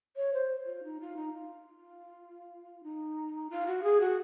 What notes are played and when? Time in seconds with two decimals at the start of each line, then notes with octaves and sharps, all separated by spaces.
0.17 C#5
0.33 C5
0.66 F4
0.83 D#4
1.00 F4
1.17 D#4
1.33 F4
2.83 D#4
3.50 F4
3.67 F#4
3.83 G#4
4.00 F#4